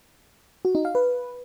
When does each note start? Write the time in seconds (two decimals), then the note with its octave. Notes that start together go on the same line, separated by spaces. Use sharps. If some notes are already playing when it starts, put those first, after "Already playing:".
0.65 F#4
0.75 D#4
0.85 F5
0.95 B4